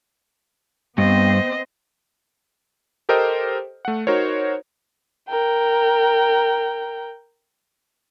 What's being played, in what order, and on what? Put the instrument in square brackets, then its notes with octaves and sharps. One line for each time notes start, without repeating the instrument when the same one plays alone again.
[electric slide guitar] G2 [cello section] B3 C4 C5 [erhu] D#5
[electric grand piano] G4 A4 A#4 C5 D#5 G5
A3 F#5
D#4 F#4 A#4 C5 C#5
[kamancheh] A#4 G5